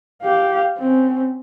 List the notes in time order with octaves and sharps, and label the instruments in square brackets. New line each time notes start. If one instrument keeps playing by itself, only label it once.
[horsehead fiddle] G4 F5
C4 C#4